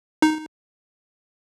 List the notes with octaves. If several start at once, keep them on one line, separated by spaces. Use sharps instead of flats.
D#4